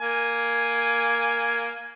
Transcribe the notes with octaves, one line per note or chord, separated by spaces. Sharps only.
A#3 G#5